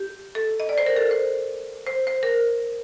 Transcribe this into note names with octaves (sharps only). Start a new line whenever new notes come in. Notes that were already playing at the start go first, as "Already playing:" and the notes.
Already playing: G4
A4
D#5
D5
C5
A#4
A4
C5
C5
C5
A#4